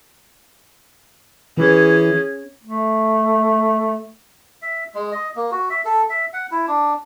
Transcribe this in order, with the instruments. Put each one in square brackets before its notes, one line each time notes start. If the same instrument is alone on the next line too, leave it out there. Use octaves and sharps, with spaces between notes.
[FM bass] E3 [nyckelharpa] C#4 G#4
[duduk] A3
[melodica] E5
G#3
D#5
A#3
F#4
E5
A4
E5
F#5
E4
D4